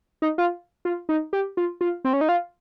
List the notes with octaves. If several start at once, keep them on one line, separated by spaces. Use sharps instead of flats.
D#4
F4
F4
D#4
G4
F4
F4
C4
C#4
D#4
F4